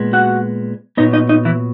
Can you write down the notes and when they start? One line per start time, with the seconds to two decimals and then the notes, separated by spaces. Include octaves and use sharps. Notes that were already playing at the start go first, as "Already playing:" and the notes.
Already playing: A#2 G#3 B3
0.13 F#4 F#5
0.97 A#2 F#3 B3 D#4 D#5
1.13 D#4 D#5
1.29 D#4 D#5
1.45 E3 E4